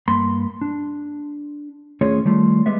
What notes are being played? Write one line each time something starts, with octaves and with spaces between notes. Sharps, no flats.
G2 A#3 B5 C6
D4
D#2 A3 C#4 F4 G#4 C#5
D#3 G3 A3 F4
G3 G#3 B3 E5